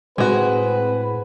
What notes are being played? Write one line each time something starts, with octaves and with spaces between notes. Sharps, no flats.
A2 G#3 C4 F#4 G#4 B4